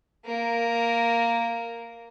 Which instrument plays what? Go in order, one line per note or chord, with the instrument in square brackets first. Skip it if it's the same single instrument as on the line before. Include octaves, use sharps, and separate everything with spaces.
[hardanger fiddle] A#3 A#4